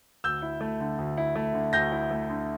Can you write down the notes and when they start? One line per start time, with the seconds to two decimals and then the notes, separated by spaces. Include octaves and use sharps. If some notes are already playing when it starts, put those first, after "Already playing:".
0.24 D2 E6 G6
0.42 E4
0.61 A3
0.80 D3
0.98 D2
1.17 E4
1.36 A3
1.54 D3
1.73 D2 G6 A#6
1.92 E4
2.11 A3
2.30 D3